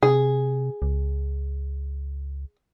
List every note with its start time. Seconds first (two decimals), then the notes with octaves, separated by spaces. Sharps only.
0.03 C3 G#4
0.82 C#2